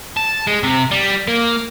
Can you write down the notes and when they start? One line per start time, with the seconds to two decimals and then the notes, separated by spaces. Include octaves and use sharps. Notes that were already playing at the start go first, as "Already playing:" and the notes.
0.17 A5
0.47 G#3
0.63 C3
0.91 G3
1.27 A#3